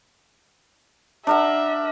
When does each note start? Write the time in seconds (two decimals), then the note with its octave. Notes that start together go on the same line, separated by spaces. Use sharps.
1.27 D4 A#4 E5 F#5